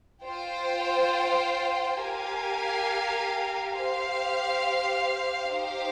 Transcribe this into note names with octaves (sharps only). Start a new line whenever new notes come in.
F4 C5 G5
G4 A#4 F5 G#5
G4 C5 F5
D#4 G4 C5 F5